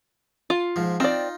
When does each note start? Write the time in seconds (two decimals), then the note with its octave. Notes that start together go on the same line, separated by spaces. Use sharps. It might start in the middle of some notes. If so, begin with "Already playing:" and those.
0.50 F4
0.76 G#2 F3
1.00 C4 D#4 F4 D5